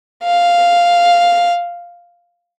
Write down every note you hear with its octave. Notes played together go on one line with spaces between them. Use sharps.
F5